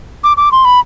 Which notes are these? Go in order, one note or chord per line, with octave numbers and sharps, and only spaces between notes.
D6
D6
C6
B5